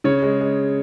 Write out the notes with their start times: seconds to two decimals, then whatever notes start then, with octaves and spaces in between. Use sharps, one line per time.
0.04 C#3 C#5
0.22 G#3
0.41 G#3